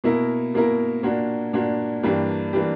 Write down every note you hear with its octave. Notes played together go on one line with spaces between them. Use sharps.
B2 A#3 E4 A#4
B2 A#3 E4 A#4
A#2 A#3 D4 F#4
A#2 A#3 D4 F#4
G2 E3 A#3 D4 G4
E3 A#3 D4 G4